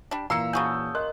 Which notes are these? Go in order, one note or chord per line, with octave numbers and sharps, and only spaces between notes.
G3 D4
A#2 E3 A#3 F5 A#5 C6 E6 C#7
C#3 F#4 G#4 A5 D#6 G6
A#4 D#5 C6 F#6